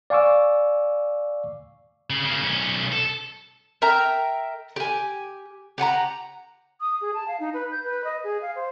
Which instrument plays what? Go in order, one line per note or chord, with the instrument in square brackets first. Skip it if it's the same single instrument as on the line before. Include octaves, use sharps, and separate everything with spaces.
[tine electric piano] D5 F5 G#5 C#6 D6 E6
[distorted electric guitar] C#3
C#3 A#3
B1 C#4
A4
[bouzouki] A#4 E5 G5 A#5
G4 G#5
G4 F#5 G#5 A#5
[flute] D#6
G#4
A5
F5
D#4
B4
G6
B4
D#5
G#4
F5
C5